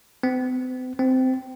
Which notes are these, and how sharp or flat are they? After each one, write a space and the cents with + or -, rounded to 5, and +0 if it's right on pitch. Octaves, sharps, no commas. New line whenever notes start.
C4 -45
C4 -15